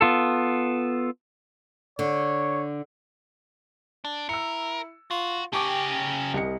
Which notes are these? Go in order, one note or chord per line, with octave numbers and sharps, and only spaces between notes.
B3 F4 A4
D3 C#5
D4
E4 A#4 E6 C#7
F4 F#4
C#3 C#4 G4 G#4 G5 A5 C#6 D6
C2 A#4 D#5 C#7